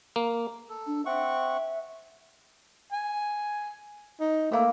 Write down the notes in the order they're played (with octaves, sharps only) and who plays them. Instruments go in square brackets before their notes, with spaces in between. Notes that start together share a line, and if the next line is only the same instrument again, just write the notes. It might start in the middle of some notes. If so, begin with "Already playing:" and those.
[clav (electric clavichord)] A#3
[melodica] A4
[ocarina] D4
[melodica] C4 F#5 C#6 [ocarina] E5
[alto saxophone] G#5
D#4
[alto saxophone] A3 [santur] A#3 E6